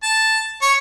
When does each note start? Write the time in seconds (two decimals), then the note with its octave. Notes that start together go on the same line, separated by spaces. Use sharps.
0.03 A5
0.62 C#5